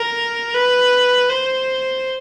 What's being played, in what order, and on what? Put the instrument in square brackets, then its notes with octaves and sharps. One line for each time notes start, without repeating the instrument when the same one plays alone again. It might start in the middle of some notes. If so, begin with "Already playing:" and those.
Already playing: [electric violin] A#4
B4
C5